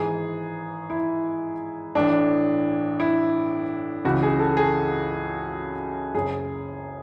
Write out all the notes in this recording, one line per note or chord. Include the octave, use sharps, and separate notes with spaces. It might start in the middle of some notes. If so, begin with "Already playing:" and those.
Already playing: G#1 G#2 E3 G#4
E4
A1 A2 E3 D4
E4
C#2 C#3 E3 F#4
G#4
A4
G#4
F#1 F#2 C#3 G#4